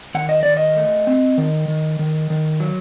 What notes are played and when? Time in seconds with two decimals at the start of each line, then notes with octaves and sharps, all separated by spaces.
0.15 D#3 F#5
0.29 D#5
0.43 D#3 D5
0.57 D#5
0.76 A3
1.07 C4
1.38 D#3
1.68 D#3
1.99 D#3
2.30 D#3
2.60 F#3